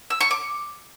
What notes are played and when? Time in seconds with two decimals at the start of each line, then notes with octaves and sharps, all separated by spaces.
0.10 E6
0.20 C#6
0.31 D6